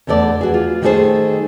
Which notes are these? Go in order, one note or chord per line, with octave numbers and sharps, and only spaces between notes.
E2 D3 A3 B3 D5
F#4 G#4
F4
D#3 G3 A3 D#4 G#4 C5